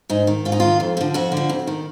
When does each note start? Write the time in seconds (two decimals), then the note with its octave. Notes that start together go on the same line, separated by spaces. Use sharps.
0.10 G#2 D#4
0.27 D#3
0.45 G#2 F4
0.52 D#4
0.60 D#3 F4
0.80 F2
0.97 D3 F3
1.14 F2 F#4
1.32 D3 F3
1.49 F2
1.67 D#3